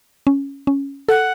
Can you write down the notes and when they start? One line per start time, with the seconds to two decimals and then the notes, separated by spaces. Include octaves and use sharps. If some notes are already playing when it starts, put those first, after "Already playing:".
0.27 C#4
0.67 C#4
1.09 A4 F#5